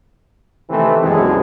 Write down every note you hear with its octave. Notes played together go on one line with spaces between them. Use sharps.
C3 D#3 E3 A3 C4
C2 F#2 B2 G#3